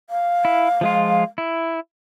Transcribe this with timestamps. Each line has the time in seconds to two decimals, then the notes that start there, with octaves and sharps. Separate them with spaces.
0.10 F5
0.45 E4
0.81 F3 G#3 F4
1.38 E4